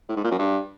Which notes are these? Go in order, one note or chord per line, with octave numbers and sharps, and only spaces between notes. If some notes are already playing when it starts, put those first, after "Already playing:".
A2
G#2
A#2
F#2
G2